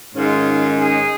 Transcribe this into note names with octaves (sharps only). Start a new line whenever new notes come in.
G#2 D#3 G#3 C#4 F4
G#4